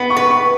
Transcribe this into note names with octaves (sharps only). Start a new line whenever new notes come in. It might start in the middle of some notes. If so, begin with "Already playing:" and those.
Already playing: B3 B5
C#6
B4
C#6